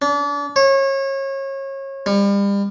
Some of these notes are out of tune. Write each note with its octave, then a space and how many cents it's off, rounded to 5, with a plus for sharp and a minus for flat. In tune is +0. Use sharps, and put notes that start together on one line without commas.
D4 -35
C#5 -30
G3 +35